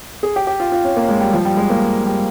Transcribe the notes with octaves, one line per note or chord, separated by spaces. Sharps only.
G#4
G4
G4
F4
F4
C#4
A#3
G#3
G3
F3
G3
G#3
A#3
G3